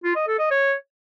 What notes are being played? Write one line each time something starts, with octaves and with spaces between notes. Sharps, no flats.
F4
D#5
A4
D#5
C#5